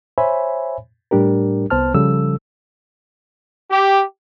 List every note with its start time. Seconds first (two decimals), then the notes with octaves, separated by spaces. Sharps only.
0.18 C5 C#5 E5 G#5 B5
1.11 A2 G3 D4 G4 A#4
1.70 C2 B3 C5 A5 F6
1.94 C#3 F3 G3 A4 E6
3.70 G4